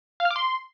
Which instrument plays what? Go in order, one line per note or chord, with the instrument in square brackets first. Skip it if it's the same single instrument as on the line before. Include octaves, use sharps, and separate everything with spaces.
[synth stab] F5
F6
D6
C6